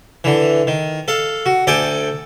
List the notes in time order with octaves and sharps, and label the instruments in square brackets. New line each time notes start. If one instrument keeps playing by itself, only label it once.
[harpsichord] D3 E3
D#3
A4 F5
F#4
D2 A4 D5 G5 G#5 D6